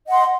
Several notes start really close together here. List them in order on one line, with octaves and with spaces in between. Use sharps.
D#5 F#5 C6